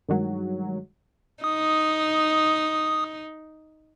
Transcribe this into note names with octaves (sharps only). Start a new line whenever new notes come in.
G2 D#3 F#3 G#3
D#4 D#6